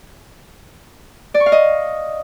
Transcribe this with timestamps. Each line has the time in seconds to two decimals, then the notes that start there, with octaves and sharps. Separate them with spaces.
1.34 D5
1.40 C#6
1.46 F5
1.52 D#5